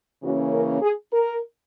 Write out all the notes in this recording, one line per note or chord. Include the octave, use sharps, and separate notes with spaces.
C#3 E3 A#3 C#4 F#4
A#4
G#4
A#4